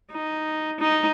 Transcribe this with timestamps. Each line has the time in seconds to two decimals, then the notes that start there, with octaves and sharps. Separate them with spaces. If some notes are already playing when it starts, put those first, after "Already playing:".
0.12 D#4
0.80 D#4